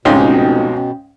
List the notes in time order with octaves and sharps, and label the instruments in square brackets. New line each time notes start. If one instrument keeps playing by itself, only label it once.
[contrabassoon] F1 [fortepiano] C#2 G#2 C6 [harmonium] B2 [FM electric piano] C#4 G5